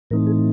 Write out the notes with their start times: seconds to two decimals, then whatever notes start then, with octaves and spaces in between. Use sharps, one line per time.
0.10 A2 E3 A3 C4 D#4 A#4
0.27 G#4